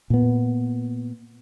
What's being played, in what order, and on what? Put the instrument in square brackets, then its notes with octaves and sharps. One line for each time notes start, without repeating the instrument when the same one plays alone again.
[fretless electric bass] A#2 B3